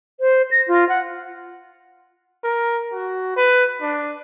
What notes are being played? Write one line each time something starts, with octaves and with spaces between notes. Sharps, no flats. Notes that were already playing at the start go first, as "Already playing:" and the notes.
C5
A#6
F4
F#5
A#4
F#4
B4
D4